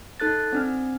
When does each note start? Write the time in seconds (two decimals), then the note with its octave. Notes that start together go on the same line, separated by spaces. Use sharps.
0.20 D#4 A4 F#6 A6
0.53 C4 D4 F6